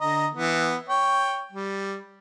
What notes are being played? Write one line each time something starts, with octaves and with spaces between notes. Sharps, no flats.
D3 D#5 A#5
E3 B3
C#5 G5
G3